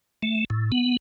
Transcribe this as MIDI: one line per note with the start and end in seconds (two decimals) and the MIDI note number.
0.23 0.45 57
0.50 0.71 45
0.72 0.97 59